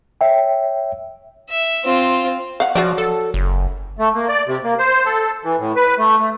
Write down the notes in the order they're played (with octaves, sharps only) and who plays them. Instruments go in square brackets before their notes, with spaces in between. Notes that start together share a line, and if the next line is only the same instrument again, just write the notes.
[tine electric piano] C#5 E5 G5
[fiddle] E5
C4 F4
[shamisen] F5 F#5
[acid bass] F3 [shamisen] F#3 F#4 D5
[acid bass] A4
F#1
[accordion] A3
A#3
D5
C3
A#3
C5
A4
E3
A2
B4
A3
A3